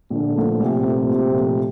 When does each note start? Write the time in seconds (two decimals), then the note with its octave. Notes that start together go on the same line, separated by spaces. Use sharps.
0.10 A#1 D3
0.36 A#2 F3 A3
0.60 A#1 C3
0.84 A#2 F3 A3
1.09 A#1
1.33 A#2 F3 A3